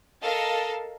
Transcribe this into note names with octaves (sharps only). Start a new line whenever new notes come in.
A4 A#4 D#5 F5 A5